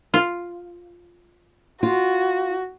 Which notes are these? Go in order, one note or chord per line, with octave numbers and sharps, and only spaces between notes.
F4
F4 F#4